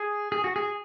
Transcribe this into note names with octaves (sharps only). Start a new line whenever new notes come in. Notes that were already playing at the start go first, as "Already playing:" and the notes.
Already playing: G#4
G#4
F#4
G#4